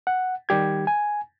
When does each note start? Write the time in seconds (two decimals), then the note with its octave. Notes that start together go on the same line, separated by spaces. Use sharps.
0.07 F#5
0.49 D#3 G3 G4 G#6
0.87 G#5